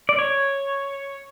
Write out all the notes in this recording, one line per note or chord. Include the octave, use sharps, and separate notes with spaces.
D5
C#5